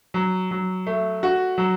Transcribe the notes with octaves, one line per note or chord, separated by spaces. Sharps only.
F#3
F#3
A3
F#4
F#3